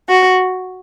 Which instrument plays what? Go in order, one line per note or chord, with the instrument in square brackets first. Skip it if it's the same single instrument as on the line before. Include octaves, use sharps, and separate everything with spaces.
[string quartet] F#4